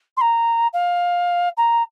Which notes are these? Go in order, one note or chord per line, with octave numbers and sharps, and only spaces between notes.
C6
A#5
F5
A#5